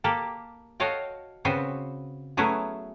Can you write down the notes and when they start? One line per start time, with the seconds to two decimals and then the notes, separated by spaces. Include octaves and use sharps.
0.04 A#3 G4 A4
0.80 F#4 A4 C#5 D#5 F5 G5
1.45 C#3 B3 C4 F#4 B4 C5
2.37 F#3 A3 B3 C#4 E4 G#4